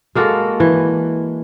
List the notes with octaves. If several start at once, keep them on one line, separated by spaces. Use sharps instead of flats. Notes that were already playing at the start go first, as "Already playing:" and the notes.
G#3 A#3 F#4 A4
E3